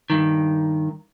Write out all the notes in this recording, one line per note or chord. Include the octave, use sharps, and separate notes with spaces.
G2 D#3